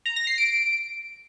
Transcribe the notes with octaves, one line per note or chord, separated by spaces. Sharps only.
A#5
A#6
C7
D7